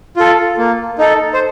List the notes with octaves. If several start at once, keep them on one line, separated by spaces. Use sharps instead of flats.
F4 A4
A#3
D#4 A4
C5